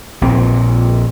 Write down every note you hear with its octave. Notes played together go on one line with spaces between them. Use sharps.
A#1 A#2 C4